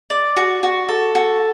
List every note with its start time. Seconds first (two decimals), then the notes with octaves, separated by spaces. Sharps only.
0.10 D5
0.37 F#4
0.63 F#4
0.89 A4
1.15 F#4